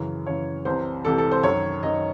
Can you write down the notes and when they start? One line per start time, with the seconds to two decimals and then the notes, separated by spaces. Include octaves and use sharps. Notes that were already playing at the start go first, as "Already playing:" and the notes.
Already playing: F#2 C#3 E3
0.27 F#2 C#3 E3 C#5
0.65 C2 C3 E3 C5
1.05 C2 C3 E3 A4
1.18 A4
1.31 C5
1.43 F#2 D#3 C#5
1.83 F#2 D#3 D#5